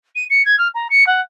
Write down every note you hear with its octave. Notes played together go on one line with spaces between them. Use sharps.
D#7
C#7
G#6
F6
A#5
C#7
F#5